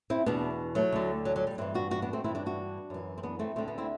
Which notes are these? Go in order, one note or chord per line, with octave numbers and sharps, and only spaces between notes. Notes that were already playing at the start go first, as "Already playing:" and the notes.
C4 E4
E2 B2 B3 D4
F#3 A3
D2 D3
F#3
F#3
G3
G2 E3 C4 E4
D4 F#4
D4 F#4
B3 D4
A3 C4
G2 E3 C4 E4
D4 F#4
D4 F#4
F#2 E3
C4
B3 D4
A3 C4
D2 D3 A3 C4
B3 D4
C4 E4